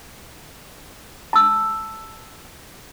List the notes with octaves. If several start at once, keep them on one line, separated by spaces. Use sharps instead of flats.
A5 E6